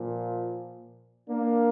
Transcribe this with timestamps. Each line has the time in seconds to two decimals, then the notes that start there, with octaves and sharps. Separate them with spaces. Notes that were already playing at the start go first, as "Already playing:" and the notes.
Already playing: A#2 F3
1.29 A#3 D4